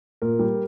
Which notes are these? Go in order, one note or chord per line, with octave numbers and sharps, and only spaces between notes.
A#2 A#4
G3